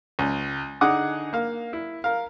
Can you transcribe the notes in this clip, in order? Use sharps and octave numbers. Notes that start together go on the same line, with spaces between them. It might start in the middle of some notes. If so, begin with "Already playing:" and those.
C#2
D3 D#4 G#4 F#5 D6 D#6
A#3 F5
E4
A#4 F5